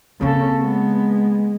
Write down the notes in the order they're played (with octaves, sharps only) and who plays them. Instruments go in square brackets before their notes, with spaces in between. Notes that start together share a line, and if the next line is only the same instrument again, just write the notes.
[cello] C#3 A4 [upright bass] A#3 C4
[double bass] G#3 [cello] B3